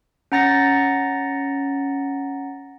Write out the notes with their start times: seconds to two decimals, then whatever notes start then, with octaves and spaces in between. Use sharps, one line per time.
0.32 C#4 F#5 A#5 A6 A#6 C#7